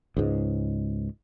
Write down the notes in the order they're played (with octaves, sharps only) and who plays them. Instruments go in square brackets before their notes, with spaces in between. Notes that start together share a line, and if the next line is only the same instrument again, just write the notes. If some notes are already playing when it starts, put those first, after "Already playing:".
[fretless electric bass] C#2 G#2